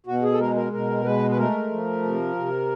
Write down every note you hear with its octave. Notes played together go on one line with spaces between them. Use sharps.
B2 F#4
G#4
A4
G#3 A#4
A#4
B2 A#4
G#3 B4
B4
A3 A#4
F3
C3
C3